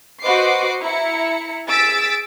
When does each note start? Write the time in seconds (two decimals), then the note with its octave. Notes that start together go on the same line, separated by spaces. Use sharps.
0.22 F#4 B4 C5 D#5 D6 C7
0.80 E4 A#5 C#7
1.67 G#4 E6 A6 B6 D7